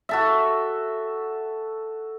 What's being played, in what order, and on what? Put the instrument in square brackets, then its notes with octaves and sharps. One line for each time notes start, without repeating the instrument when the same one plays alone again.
[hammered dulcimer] F#4 A4 E5